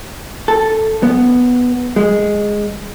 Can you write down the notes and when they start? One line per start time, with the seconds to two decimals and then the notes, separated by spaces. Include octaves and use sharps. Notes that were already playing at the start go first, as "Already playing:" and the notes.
0.48 A4
1.03 B3
1.96 G#3